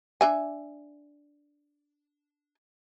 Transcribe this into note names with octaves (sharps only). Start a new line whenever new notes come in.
D4 E5 G#5